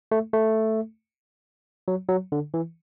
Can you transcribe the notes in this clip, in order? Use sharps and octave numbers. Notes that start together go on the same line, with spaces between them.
A3
A3
F#3
F#3
D3
E3